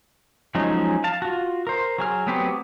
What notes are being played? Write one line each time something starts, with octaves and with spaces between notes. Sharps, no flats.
F3 F#3 G#3 C#4 D#4
F5 A5
F4 F#4
A#4 C5
F#3 G#4 F6
F#3 A3 B3 C4 G4